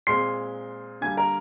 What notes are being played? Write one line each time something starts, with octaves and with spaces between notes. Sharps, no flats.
A#2 G#3 C4 C6 C7
D3 G3 A#3 G#5 G#6
A#4 A#5